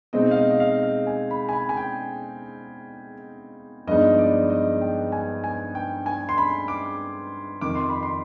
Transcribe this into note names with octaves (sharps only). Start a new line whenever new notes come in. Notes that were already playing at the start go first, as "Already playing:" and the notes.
B2 G#3 C4 D#4 D#5
F5
D#5
D#5
F5
F5
G#5
B5
G#5
B5
G#5
G5
G2 F3 G#3 B3 D#4 D#5
D5
D#5
G5
G#5
G#5
G5
G#5
C6
B5
D6
F2 C3 D#3 D6
C6
B5
C6